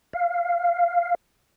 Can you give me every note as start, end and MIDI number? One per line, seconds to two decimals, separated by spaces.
0.13 1.15 77